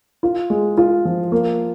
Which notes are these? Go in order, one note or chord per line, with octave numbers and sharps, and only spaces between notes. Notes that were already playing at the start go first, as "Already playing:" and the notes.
F4
G#3
F4
F3
A#3